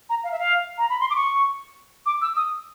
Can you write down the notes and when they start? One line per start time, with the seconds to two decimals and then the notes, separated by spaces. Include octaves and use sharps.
0.10 A#5
0.24 F5
0.32 E5
0.39 F5
0.78 A#5
0.89 B5
1.01 C6
1.10 D6
1.16 C#6
2.06 D6
2.22 E6
2.36 D#6